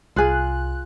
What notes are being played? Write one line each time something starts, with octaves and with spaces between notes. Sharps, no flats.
C2 F4 G#4 F#6